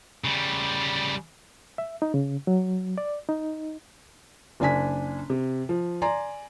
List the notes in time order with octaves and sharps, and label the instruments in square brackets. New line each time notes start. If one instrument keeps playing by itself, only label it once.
[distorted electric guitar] C#3 G3
[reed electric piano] E5
D#4
C#3
F#3
D5
D#4
[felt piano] F#1 D4 G#5 B6
C3
F3
D5 G#5 A#5 C6